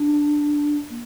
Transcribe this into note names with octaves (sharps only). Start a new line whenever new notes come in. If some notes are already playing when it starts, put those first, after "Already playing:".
Already playing: D4
A#3